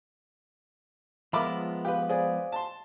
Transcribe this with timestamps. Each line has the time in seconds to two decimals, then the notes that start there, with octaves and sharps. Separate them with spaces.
1.33 F3 G#3 B3 F4 A#4 E5 B5 D6
1.85 G4 B4 F5 G5
2.09 G#4 C5 D5 F5 G#5
2.52 A5 C6